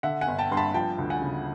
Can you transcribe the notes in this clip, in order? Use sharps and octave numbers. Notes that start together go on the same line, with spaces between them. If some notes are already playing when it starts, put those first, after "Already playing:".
D3 E5 F#5
F#5 G#5
G1
G5 A5
G2 C6
A5 B5
F3 G5 A5
D2
F#5 G#5
C#3